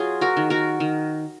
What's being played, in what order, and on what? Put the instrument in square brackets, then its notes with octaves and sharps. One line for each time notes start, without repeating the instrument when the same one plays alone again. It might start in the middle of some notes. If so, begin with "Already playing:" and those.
Already playing: [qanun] F#3 F4 G#4
F#4 A#4
D#3
F#4 A#4
D#3